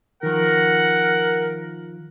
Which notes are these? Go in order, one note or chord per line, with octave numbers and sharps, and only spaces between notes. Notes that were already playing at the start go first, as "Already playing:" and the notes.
D#3 F3 A#4 F#5